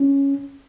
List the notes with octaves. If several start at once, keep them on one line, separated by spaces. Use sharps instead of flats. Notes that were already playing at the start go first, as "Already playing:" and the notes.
Already playing: C#4